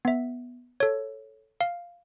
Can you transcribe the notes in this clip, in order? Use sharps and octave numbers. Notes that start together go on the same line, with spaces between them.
B3 E5
A4 C#5
F5